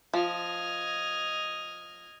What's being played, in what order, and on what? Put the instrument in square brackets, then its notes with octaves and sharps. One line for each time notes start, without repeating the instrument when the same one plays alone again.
[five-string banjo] F3 [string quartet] D#5 F6 G#6